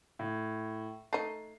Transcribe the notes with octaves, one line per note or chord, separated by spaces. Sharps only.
A2
A3 D#4 C7